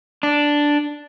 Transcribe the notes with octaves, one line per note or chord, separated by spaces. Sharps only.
D4